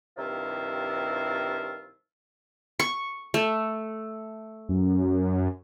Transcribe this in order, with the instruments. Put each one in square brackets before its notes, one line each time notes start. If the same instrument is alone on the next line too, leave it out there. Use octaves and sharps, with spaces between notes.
[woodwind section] G2 C3 D#3 F3 E4 F4
[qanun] C#6
A3
[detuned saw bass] F#2